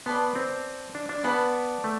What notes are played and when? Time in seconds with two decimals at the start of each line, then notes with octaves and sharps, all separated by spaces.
0.06 B3 B4 D5 A5 C6
0.35 C4
0.95 D4
1.09 D4
1.24 B3 B4 D5 F#5 A5
1.84 A3